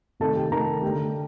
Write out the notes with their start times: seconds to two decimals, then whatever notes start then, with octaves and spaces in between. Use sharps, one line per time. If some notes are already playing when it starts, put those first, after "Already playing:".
0.20 C3 D#3 A3 A4 A5
0.36 G4 G5
0.51 C3 D#3 A3 A#4 A#5
0.82 D3 A3 G4 G5